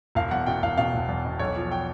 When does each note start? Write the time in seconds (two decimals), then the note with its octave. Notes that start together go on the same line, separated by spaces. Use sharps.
0.15 E1 F5
0.31 E2 F#5
0.46 B2 G5
0.62 E1 F5
0.78 B2 F5
0.94 E1
1.08 E2
1.25 B2
1.39 B1 C#5
1.56 F3
1.71 G5